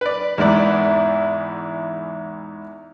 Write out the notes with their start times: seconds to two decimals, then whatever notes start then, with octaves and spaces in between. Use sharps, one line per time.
0.01 B4 D5
0.38 E2 G#2 E4 D5